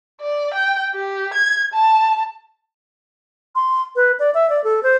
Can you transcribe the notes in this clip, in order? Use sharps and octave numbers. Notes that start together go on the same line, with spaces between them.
D5
G5
G4
G#6
A5
C6
B4
D5
E5
D5
A4
C5